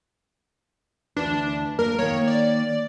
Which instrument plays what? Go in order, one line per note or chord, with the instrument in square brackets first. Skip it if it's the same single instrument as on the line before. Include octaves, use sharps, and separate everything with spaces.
[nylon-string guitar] D2 E3 B4 [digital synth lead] D4
[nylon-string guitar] A#3 D#5 [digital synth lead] A#4
[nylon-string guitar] D#3 A#3 [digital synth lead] C#5
[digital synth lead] D5